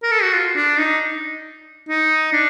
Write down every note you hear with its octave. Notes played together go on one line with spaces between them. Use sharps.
A#4
A4
F#4
F4
D4
D#4
D#4
D4